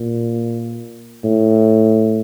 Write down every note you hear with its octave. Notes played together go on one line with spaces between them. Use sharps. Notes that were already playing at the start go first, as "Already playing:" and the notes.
Already playing: A#2
A2